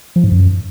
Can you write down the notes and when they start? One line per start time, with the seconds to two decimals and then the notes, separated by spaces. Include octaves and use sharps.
0.16 F3
0.24 G#2
0.32 F#2